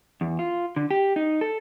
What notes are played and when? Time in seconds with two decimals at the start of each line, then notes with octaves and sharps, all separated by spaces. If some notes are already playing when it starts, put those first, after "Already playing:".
0.21 E2
0.39 F4
0.76 D3
0.91 G4
1.16 D#4
1.41 A4